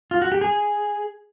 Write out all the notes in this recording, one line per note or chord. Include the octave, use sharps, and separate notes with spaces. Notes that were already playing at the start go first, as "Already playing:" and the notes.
F4
F#4
G4
G#4